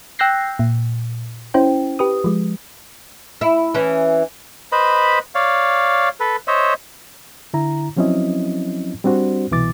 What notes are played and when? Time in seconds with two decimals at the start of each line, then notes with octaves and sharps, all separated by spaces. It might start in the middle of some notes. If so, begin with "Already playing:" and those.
0.19 G5 E6 F#6 G6 A#6 C7
0.59 A#2
1.54 C#4 E4 C5 G5
1.99 G4 B4 D#6
2.24 F3 G#3
3.41 E4
3.74 E3 C#4
4.72 B4 C5 D#5 B5
5.35 C#5 D5 F5
6.20 A4 B4
6.47 C5 C#5 D#5 E5
7.53 D3 E4 A#5
7.96 F3 F#3 C4 C#4 E4 D#5
9.04 G3 C4 D4 F#4 C5
9.51 C2 B2 E3 D6 A6